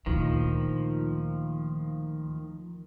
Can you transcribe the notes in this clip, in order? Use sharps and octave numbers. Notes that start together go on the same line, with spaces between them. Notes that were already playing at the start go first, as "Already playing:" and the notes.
D2 A#2 D#3 F3